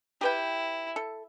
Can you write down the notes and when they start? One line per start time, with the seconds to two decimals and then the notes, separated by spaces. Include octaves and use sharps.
0.21 E4 G4 B4 G5
0.96 A4